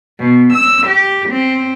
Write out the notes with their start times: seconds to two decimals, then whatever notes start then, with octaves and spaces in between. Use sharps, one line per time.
0.19 B2
0.54 E6
0.86 G4
1.29 C4